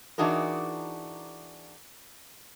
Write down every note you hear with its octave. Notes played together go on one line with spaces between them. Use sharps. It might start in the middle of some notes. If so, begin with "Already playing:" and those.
E3 D4 D#4 F#4 G#4 A#4